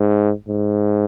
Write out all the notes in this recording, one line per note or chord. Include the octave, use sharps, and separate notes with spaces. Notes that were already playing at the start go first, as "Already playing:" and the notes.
Already playing: G#2
G#2